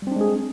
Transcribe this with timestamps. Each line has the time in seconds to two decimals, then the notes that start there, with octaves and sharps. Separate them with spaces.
0.02 G3
0.07 C4
0.12 D4
0.16 G#3
0.21 G#4